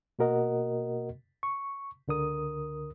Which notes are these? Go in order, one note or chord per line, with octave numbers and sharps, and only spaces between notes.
B2 A#3 F#4 A#4 D#5 F#5
C#6
C#2 D3 A#4 D#6